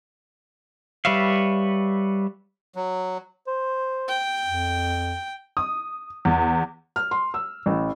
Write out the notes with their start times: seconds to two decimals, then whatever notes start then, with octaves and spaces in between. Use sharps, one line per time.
1.05 G3 B4 C#5 E5 F5
2.75 F#3
3.47 C5
4.08 G5
4.44 F2
5.57 D#6
6.25 E2
6.96 F6
7.11 C6
7.34 E6
7.66 A1